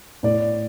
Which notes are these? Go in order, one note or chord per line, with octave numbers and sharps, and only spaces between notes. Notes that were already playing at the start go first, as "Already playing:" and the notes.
A2 D5